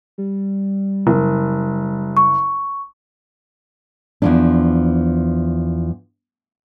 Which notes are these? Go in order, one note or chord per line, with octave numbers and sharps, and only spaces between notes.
G3
F#1
C#6
E2 F3 D4